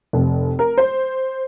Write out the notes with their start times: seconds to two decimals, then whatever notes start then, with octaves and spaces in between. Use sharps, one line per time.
0.13 F1
0.59 A#4
0.78 C5